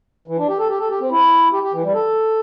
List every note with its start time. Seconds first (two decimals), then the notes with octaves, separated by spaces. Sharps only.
0.28 E3
0.38 D4
0.48 G4
0.59 A4
0.69 G4
0.79 A4
0.90 G4
1.00 C4
1.11 E4
1.53 G4
1.63 G4
1.73 E3
1.83 G3
1.94 A4